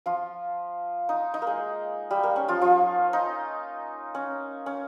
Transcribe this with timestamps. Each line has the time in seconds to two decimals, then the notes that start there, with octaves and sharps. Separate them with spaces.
0.06 F3 F4
1.09 D#4
1.34 D#4
1.42 A#3
1.47 G#3
2.11 G3
2.23 A#3
2.36 C#4
2.48 F3 F4
2.61 F3 F4
3.13 D#4
4.15 C#4
4.66 C#4